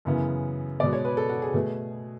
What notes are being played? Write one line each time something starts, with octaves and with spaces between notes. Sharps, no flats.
F#2 C#3 E3 B3
B2 G#3 B3 D5
C#5
B4
A4
F#4
G#4
B2 A3